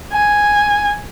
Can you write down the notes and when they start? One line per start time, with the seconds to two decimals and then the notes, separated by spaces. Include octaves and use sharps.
0.12 G#5